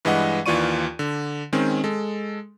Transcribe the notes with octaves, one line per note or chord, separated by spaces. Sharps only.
G2 E3 G#3 D#5 F#5
D#2 E3 F4 D5 C#6 D#7
D3
D#3 G#3 C4 C#4
G#3 A4